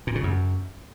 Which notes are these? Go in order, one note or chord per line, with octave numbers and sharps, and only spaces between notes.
A#2
C#3
F#2